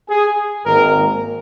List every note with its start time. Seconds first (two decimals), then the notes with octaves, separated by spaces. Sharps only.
0.10 G#4
0.66 G#1 G#2 D#3 A#3 A#4